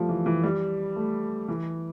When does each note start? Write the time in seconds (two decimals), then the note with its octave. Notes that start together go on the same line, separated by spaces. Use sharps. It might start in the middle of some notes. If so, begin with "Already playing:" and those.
Already playing: F3 G3 A3
0.09 E3
0.26 E3
0.43 G3
0.96 A3
1.48 E3